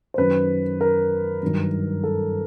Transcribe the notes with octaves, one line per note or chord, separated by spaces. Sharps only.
C5
F#2 D#3 F#3 B4
A#4
G2 D#3 F#3
A4